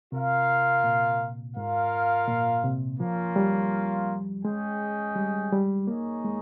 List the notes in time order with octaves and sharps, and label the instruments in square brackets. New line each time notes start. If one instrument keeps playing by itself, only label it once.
[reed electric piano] C3 [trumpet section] F4 A#4 F5
[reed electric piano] A#2
[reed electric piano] G#2 [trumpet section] F4 A#4 F5
[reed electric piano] A#2
C3
[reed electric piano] F3 [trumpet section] A#3 C#4 F4
[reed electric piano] G3
[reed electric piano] G#3 [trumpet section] C#4 G#4 D#5 G5
[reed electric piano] G3
G3
[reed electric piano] A#3 [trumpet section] D#4 G#4 C#5
[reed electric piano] G#3